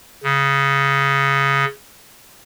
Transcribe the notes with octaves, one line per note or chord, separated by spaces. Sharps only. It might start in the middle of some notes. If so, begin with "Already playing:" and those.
C#3